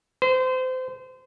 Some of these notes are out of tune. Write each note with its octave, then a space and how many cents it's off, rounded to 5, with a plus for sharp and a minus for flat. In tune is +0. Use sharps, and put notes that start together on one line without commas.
C5 -30